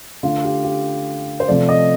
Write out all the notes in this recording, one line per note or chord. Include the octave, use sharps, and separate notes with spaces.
D3 A3 F4
G4
G4
C5
C3 F3 A3 D5
D#5